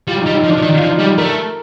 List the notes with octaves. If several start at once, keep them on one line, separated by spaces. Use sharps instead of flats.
G3 F4
D#4
G3
D#4
F3
D4
F3
D#3 D#4
F3 F4
D#4
G3
G4
A3 A#4